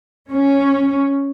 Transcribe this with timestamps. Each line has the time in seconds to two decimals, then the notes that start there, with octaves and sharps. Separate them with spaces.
0.30 C#4